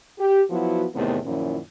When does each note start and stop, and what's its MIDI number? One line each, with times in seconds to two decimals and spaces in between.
0.19 0.42 67
0.50 0.85 53
0.50 0.85 54
0.50 0.85 59
0.50 0.85 64
0.50 0.85 66
0.95 1.17 40
0.95 1.17 45
0.95 1.17 48
0.95 1.17 51
0.95 1.17 57
0.95 1.17 59
1.26 1.58 42
1.26 1.58 46
1.26 1.58 51
1.26 1.58 53
1.26 1.58 61
1.26 1.58 64